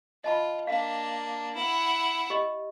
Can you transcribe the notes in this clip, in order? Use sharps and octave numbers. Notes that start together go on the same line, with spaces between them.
F4 D#5 A5 B5
A#3 D4 F5
E4 F#5
G4 D#5